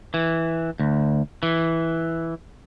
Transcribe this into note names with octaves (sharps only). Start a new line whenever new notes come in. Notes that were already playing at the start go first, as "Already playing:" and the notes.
E3
D2
E3